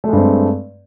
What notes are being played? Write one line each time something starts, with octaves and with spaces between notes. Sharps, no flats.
G2 G#3 A3 C4